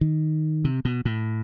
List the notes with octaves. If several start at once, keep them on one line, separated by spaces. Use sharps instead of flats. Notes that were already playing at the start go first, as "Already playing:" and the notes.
D#3
C3
B2
A2